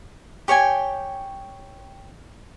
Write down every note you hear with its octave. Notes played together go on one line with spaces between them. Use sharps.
G4 C#5 G5 G#5